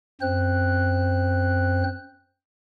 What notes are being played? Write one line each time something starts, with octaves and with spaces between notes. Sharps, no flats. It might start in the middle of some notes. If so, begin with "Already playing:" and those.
F#2 C4 C5 F#6